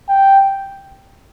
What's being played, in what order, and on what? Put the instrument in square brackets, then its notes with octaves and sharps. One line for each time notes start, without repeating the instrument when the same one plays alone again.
[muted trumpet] G5